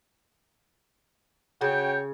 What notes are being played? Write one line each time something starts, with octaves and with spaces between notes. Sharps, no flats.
C#3 F#4 C#5 G5